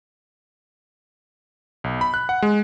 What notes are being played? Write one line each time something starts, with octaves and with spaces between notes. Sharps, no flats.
B1
B5
F#6
F#5
G#3